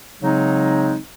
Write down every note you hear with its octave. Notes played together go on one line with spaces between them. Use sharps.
C#3 F#3 G#3 C4 D#4